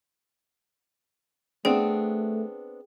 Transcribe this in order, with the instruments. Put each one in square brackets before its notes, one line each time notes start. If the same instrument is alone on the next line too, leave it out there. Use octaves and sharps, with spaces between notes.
[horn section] A3 [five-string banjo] B3 C4 D4 [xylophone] G#4 G5